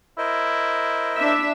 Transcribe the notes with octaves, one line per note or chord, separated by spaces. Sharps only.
E4 A#4 C5 D#5
D4 E5